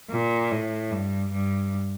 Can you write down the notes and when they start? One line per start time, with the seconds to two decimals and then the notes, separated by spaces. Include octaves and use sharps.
0.11 A#2
0.51 A2
0.91 G2
1.32 G2